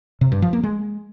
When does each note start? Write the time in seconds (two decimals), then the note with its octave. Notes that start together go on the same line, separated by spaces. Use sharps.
0.21 C3
0.32 G2
0.42 F3
0.53 A#3
0.63 G#3